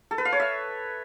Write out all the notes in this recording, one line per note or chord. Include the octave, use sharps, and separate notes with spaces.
A4
B4
F5
C#5
E5